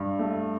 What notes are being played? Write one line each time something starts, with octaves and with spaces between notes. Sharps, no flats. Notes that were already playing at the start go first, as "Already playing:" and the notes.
Already playing: G2
A3